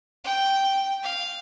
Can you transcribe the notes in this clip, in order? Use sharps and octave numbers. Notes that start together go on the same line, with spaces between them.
G5
F5